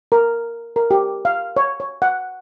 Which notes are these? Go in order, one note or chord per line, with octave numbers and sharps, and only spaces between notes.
A#4
A#4
G4
F5
C#5
C#5
F#5